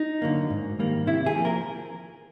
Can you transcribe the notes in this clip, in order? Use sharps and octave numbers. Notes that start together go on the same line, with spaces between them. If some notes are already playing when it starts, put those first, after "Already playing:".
Already playing: D#4
D3 F#3 A#3
G#2
D#3 G3 A#3
C3 E4
G#4
F3 A#3
A#4